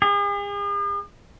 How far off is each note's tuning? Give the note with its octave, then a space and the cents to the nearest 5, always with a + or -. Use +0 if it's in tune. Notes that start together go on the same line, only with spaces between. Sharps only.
G#4 -45